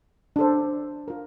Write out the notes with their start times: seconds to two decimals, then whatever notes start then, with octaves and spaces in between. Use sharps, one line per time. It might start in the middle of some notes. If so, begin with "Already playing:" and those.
0.36 D4 A4 C5
1.08 F4 A#4